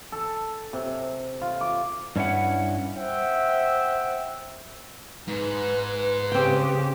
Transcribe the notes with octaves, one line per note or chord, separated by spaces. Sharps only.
A4
C3
F4
D6
G2 C#4 E4 F#5
C5 E5 F#5 G5
G#2 B4
C#3 C4 G4 G5